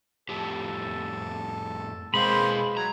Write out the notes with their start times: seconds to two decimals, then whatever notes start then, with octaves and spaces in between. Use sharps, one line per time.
0.29 F2 A2 G4 A4
2.14 B2 G#3 A#3 C4 B4 F5 B5 C6
2.77 F#3 A#5